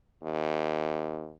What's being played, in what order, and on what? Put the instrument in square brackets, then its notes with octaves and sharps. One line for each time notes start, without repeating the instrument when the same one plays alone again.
[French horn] D#2